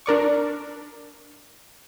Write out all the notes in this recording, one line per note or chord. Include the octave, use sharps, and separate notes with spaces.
D4 A#4 D5 C#6